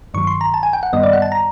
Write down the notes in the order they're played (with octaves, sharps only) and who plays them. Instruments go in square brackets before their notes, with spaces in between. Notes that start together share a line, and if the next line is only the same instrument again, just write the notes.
[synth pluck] G2 D#3 F#3 C#6
C6
A#5
A5
G#5
G5
F#5
G2 D#3 G3 B3 D#5
D5
F#5
A5
A#5